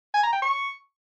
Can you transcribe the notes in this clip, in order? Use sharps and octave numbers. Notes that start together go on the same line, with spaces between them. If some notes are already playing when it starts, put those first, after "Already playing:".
G#5
A#5
G5
C#6